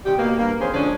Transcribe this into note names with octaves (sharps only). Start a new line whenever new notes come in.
C3 D#3 G3 G4
B2 A#3
G2 A#3
E2 C#3 C#4 G#4 C5
D3 F3 G#3 C#4 D4